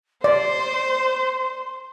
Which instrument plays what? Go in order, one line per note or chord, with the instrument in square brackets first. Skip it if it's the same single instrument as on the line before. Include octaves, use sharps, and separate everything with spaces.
[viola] C5 [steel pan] D5 [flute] C6